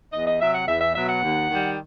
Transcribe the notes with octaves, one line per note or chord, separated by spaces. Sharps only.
E2 D#5
D#5
C3 F#3 E5
F#5
E2 E5
E5
B2 F#3 E5
F#5
D#2
D#3
G3